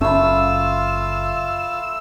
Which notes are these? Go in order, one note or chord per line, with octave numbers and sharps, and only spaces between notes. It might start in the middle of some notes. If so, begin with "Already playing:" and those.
F#1 A3 C#4 F4 F5 B5 E6